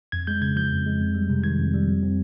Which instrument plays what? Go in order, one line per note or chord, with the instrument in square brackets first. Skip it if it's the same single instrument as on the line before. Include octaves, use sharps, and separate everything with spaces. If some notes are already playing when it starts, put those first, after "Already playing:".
[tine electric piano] F2 G#6
G#3 G6
C#3 G#6
F3 G6
F2
G#3
F2
G3
C3
D#3 G#6
F2
G3
F2
C4